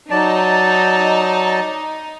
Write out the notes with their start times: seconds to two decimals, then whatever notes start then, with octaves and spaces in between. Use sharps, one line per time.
0.11 F#3 D#4 D5 A5